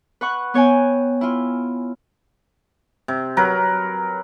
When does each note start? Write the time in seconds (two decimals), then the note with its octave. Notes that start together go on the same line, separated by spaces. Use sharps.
0.21 B4 F#5 C#6
0.54 B3 C#5 G5 G#5
1.21 E4 F4
3.08 C3
3.37 F#3 A#4 B4